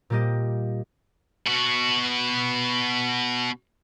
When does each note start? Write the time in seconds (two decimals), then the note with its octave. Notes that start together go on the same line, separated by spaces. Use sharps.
0.10 A#2 G3 A#3 G4 D#5
1.46 B2 F#4